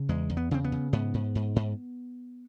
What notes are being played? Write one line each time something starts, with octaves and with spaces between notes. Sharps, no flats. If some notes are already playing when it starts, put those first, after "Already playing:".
Already playing: C#3
E2 G#3
E2
B3
C#3 C4
B3
C#3
G#2 B3
G#2
G#2
G#2